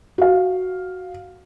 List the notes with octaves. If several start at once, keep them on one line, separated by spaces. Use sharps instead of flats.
F#4 F5